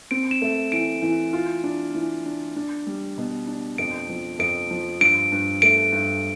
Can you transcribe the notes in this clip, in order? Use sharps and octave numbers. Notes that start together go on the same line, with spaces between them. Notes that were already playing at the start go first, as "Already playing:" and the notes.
C4 D7
E7
A3
E3 D7
E3
F4
D4
E3
D4
D4
G3
B2
D4
F2 D7
F3
F2 D7
F3
G2 D7
G2
A3 D7
G2